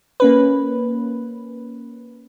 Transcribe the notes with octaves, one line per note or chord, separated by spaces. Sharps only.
A#3 C#4 B4